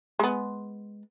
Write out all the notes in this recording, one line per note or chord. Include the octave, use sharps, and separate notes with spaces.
G#3 B3